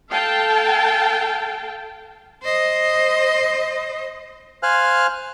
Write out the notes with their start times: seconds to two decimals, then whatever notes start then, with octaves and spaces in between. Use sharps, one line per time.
0.10 A4 F5 G5 A5
2.43 C5 D#5
4.63 C5 F5 G#5 F6 F#6